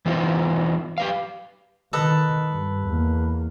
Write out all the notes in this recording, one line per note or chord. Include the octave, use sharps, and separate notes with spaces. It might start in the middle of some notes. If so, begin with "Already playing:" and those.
E3 B3 D#4 F4 C5
G4 B4 F5
D#3 A4 B4 D#5
G2
E2 A#3